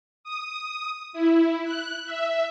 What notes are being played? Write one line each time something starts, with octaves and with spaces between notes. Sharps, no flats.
D#6
E4
F#6
E5